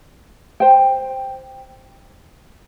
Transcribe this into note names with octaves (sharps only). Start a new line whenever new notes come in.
C5 G5